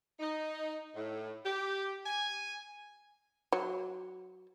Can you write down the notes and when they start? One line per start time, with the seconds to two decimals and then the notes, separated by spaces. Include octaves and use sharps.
0.20 D#4
0.96 A2
1.46 G4
2.05 G#5
3.53 F#3